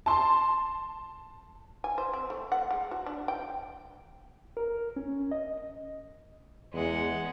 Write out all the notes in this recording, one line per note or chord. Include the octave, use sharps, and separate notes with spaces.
A5 C6
G#5
C5
C4
A3
F#5
G#3
F#4
D4
G5
A#4
C#4
D#5
E2 G#3 F#5